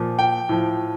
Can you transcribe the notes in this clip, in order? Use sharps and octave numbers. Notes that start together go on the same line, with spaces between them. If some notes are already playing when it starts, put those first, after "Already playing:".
Already playing: A#2 F3
G5
A2 F3